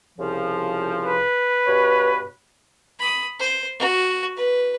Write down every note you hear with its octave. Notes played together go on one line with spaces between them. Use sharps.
C2 C#3 F3
B4
G2 B2 C#5
B5 D#6
C5
F#4
B4